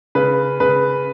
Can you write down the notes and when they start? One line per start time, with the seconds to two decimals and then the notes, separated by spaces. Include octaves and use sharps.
0.15 C#3 B4
0.60 C#3 B4